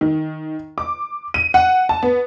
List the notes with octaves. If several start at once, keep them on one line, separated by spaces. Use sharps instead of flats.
D#3
D6
D#7
F#5
A5
B3